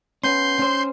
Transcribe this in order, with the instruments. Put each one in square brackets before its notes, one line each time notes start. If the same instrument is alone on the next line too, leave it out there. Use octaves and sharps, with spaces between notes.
[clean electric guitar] B3 C#4 [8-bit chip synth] C6 G6 C7
[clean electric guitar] C#4 C5